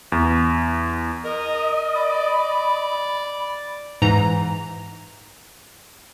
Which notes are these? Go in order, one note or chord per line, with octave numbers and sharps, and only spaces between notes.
E2
A#4 D#5
D5 B5
G#2 E3 A#5